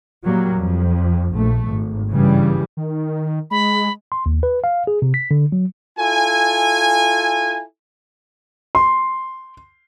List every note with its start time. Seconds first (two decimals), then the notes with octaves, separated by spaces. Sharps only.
0.24 A#2 F#3 G3 A#3
0.57 F2
1.34 A#1 A3
1.66 G#1
2.10 G2 C#3 E3 G3
2.77 D#3
3.51 G#3 B5
4.12 C6
4.26 D#2
4.43 B4
4.64 F5
4.87 G#4
5.02 C3
5.14 B6
5.31 D3
5.52 F#3
5.99 E4 F4 A4 G#5
8.75 C6